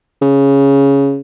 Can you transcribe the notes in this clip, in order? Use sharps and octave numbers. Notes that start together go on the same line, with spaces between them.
C#3